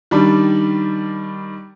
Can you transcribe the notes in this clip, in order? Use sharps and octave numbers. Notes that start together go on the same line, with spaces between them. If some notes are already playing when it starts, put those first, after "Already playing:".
D#3 G3 D4 D5 B5